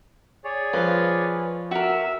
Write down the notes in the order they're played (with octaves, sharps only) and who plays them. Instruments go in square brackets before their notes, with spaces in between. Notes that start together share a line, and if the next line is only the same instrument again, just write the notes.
[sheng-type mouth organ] G#4 C#5 D5
[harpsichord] F3 [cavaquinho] B4 F5
[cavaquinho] F#4 A#4 [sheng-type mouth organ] E5 E6